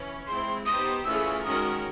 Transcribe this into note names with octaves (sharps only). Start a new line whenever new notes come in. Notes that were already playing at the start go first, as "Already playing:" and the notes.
Already playing: E3 C#4
G#3 C4 E4 C6
B3 D#4 G4 C5 D#6
E3 A3 C#4 F4 G#4 E6
D#3 G#3 C#4 F#4 A#4 D#6